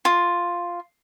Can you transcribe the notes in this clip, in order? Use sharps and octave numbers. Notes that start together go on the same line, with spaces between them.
F4